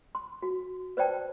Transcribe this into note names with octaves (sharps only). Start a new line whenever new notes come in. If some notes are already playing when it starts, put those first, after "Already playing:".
C6
F#4
B4 C5 D5 G5 A5